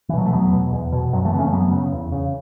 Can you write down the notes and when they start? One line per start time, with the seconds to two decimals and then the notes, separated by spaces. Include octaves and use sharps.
0.09 E3
0.13 B2 F#3
0.25 A3
0.32 E2 F#3 B3
0.53 B2
0.72 E2
0.92 B2
1.13 F#2 F#3
1.25 E3 A3
1.32 C#3 B3
1.39 A3 C#4
1.52 F#2 F#3 B3
1.72 C#3
1.92 E2
2.12 C#3